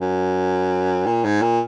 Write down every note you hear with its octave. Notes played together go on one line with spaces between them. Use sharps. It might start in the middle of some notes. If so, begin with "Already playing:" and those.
F#2
A#2
G#2
A#2